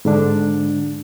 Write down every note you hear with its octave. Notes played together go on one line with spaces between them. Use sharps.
G#2 D3 D4